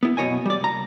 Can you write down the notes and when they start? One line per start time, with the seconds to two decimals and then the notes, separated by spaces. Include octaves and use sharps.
0.03 B3 E4
0.17 F#2 B2 C#4 C#5 D#5 G#5
0.46 G3 D5
0.60 C2 A#5